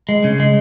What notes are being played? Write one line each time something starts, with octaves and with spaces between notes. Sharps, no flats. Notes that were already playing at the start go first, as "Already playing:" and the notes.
G#3
C#3
G#3